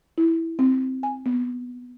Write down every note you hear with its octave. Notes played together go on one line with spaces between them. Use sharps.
E4
C4
G#5
B3